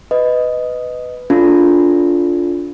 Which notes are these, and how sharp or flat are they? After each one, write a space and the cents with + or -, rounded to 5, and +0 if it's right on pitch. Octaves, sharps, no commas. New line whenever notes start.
B4 +15 D#5 +0
D4 -25 F4 +0 A4 +0